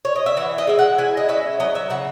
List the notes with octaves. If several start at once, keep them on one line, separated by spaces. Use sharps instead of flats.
C#5
D#5
E5
E3 F#5
D#5
G#3 E5
F#5
E4 G#5
D#5
C#4 E5
F#3 D#5
E5
C#3 F#5